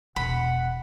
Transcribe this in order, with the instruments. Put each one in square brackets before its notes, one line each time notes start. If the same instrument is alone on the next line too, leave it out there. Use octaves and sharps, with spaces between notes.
[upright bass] E1 [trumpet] F#5 [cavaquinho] B5